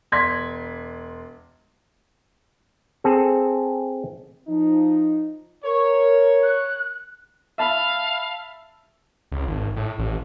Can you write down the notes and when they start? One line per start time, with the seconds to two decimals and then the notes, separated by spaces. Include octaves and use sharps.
0.12 E1 D5 C6 G#6 B6
3.04 C4 G#4 A4
4.47 F3 D#4
5.64 A#4 C#5
6.43 F#6
7.58 E5 F5 A5 B5
9.32 C#2
9.47 G#1
9.76 A2
9.98 A1